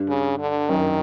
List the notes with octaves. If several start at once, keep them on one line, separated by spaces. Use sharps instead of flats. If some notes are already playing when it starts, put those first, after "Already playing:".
Already playing: G2
C#3
D3
F#2 D#3